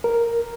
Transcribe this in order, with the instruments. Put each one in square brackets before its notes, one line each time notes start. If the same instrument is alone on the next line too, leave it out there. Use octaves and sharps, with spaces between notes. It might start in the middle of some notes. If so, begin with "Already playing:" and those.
[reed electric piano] A#4